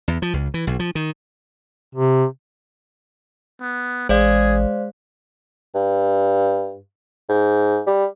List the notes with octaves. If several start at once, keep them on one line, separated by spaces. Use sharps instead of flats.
E2
F3
C#2
E3
B1
F3
D#3
C3
B3
A1 G#3 G#4 C5 D5 F5
G2
G#2
G3